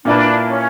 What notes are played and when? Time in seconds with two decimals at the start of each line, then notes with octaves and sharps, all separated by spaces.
0.05 A#2 A#3 D4 E4 B4
0.47 C#4